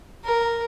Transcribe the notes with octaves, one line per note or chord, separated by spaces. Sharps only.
A#4